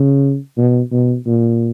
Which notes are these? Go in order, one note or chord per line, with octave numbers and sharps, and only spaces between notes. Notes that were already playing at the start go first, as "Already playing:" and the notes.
Already playing: C#3
B2
B2
A#2